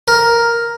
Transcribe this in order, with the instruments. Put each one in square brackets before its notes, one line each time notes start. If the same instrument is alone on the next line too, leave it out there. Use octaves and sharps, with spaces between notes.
[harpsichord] A#4